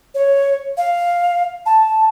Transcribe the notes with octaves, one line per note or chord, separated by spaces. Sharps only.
C#5
F5
A5